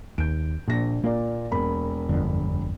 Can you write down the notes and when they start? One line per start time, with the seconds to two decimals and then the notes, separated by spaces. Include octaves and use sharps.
0.18 D#2 G6 D7
0.68 A#1 A#2 A#6
1.04 A#2 A#3 D5
1.51 E1 A#4 B5
2.09 G1 F2 D3